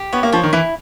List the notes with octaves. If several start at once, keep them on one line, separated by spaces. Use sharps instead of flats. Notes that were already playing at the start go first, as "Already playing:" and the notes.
Already playing: G4
B3 C#5
A#3
F3 C#5
D#3
E3 E4